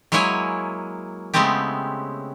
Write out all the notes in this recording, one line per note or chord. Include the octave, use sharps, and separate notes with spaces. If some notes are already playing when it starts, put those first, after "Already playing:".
F#3 G#3 A#3 E4 C#5 G#5
C#3 G#3 A3 B3 C4 G4